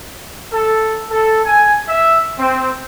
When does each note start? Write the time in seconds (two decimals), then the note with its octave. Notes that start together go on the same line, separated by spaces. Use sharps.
0.52 A4
1.10 A4
1.44 G#5
1.88 E5
2.38 C4